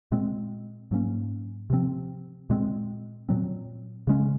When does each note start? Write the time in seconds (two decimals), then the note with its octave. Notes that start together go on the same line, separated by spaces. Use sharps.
0.12 A#2 G#3 C4
0.91 G#2 F#3 A#3 C#4
1.70 C3 F3 C4
2.50 A#2 G#3 C4
3.29 A#2 F#3 C4
4.07 C#3 G#3 C#4